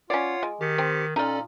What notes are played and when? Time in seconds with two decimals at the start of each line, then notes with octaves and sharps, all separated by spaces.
0.10 C#4 F4 C#5 D5 F#5 C7
0.43 G#3
0.61 D#3 G4 B6 C#7
0.78 C4
1.16 A#2 C#4 D#4 F4 A4 D5